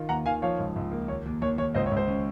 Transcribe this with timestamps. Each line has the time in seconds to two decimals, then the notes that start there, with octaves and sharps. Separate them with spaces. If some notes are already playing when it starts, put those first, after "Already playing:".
Already playing: D#3 F4
0.09 D#2 F#5 A#5
0.26 D#3 F5 G#5
0.42 F3 C#5 F5
0.59 C#2
0.76 C#2
0.91 A#3
1.08 D#2 C#5
1.26 D#2
1.42 D#2 C#5
1.58 D#2 C#5
1.74 C#2 C5 D#5
1.86 C#5
1.91 C#2
1.97 C5
2.08 C#4